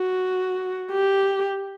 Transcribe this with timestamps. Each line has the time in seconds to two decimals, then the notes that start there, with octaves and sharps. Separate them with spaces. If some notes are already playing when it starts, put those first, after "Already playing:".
Already playing: F#4
0.92 G4